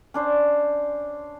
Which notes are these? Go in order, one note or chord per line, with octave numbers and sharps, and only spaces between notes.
C#4 D4 C5